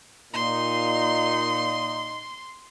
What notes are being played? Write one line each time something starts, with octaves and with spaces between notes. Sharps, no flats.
A#2 D#4 C6